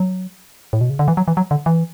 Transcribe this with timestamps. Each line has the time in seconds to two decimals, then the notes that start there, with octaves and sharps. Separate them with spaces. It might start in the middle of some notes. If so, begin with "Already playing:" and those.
Already playing: F#3
0.73 A2
0.81 B2
0.90 C#3
0.99 D3
1.08 E3
1.17 F#3
1.28 E3
1.37 F#3
1.51 D3
1.66 E3